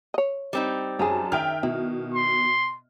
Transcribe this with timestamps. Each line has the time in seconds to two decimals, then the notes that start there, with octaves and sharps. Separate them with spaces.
0.14 C#5 D#5
0.53 G3 C4 D#4
0.99 F#2 C#4 G#4 A5
1.32 D#3 E5 G5 F6
1.63 B2 E4
2.14 C6